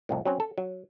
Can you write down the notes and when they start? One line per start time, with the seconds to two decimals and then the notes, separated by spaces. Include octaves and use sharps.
0.09 C2 F2 A2
0.25 F#3 C4 C#4
0.40 A4
0.58 F#3